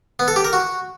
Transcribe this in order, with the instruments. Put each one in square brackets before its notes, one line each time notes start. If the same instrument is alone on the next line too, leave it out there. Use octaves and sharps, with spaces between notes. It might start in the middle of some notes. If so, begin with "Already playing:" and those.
[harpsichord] B3
A4
G4
A#4
F#4